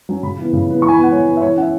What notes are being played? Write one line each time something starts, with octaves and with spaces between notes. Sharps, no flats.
F#3 C#4
C#3 B5
E3 B3
C#3
E3 B3
E3 C#6
G#5
B5
B3
F#5
E3 C#5
B3
E5
E3 C#5
C#4 F#5
E5